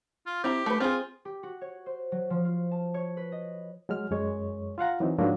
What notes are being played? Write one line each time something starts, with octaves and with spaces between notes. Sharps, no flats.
F4
C4 E4 G4 A#5
A3 B4
C4 F4 G#4
G4
F#4
C#5
C5
F#3
F3
F4
A5
C#5
B4
D#5
F#3 G#3 F6
F#2 G#3 C#5
F4 F5 F#5 A#5
E3 F#3 C4 D#4
G#2 F3 F#3 A#3 D4 F4